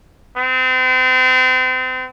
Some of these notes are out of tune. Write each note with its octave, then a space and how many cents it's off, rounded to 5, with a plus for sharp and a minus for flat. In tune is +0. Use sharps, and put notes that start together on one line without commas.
C4 -35